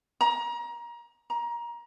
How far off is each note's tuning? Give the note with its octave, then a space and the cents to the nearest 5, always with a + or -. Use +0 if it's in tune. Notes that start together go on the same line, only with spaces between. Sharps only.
A#5 +25
A#5 +20